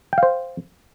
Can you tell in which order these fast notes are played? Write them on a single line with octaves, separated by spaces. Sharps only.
G5 F5 C5